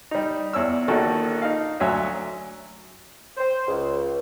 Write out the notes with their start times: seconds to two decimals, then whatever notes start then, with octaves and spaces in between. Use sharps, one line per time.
0.11 G3 D#4
0.53 E2 C#5 D5 E6
0.88 A#1 A#2 D#3 A#3 F#4 A4
1.42 D#4 F5
1.80 D2 F#3 C#5 E5 G#5
3.37 C5
3.68 C#2